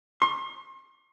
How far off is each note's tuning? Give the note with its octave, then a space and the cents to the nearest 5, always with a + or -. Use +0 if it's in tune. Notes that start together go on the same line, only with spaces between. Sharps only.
C6 +40